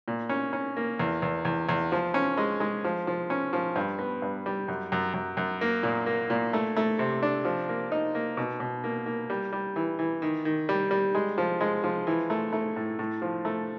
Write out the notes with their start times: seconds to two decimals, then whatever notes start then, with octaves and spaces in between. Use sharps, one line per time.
0.08 A#2
0.29 C#4
0.53 C#4
0.77 A#3
0.99 E2
1.22 E2
1.45 E2
1.69 E2
1.92 F3
2.14 C#4
2.37 G#3
2.60 G#3
2.84 F3
3.07 F3
3.30 C#4
3.53 F3
3.76 G2
3.99 B3
4.22 G2
4.46 G3
4.68 F#2
4.92 F#2
5.14 F#2
5.37 F#2
5.61 A#3
5.83 A#2
6.06 A#3
6.30 A#2
6.53 A3
6.76 A3
6.99 C3
7.23 D4
7.45 F3
7.69 A#3
7.92 D#4
8.15 A#3
8.37 B2
8.60 B2
8.84 A#3
9.06 A#3
9.30 G3
9.53 G3
9.76 E3
9.99 E3
10.22 D#3
10.45 D#3
10.69 G3
10.91 G3
11.14 G#3
11.38 F3
11.61 G#3
11.84 F3
12.07 E3
12.30 A3
12.53 A3
12.76 A2
12.99 A2
13.22 F3
13.45 A3